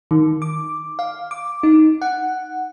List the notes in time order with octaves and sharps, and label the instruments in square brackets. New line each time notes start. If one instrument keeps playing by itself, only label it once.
[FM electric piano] D#3
D6
F5
D6
D#4
F#5